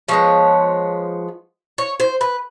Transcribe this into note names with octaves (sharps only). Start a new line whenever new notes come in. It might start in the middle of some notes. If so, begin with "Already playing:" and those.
F3 G#3 B3 C#5
C#5
C5
B4